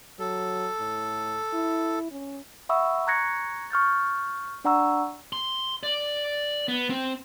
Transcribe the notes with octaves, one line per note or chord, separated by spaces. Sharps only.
F#3 A4
A2
E4
C#4
E5 F#5 B5 C#6 D#6 E6
A#5 C#6 F#6 G#6 A#6 C#7
C#6 F6 G6 A6
D4 D5 F#5 A#5 C#6 E6
C6
D5
B3
C4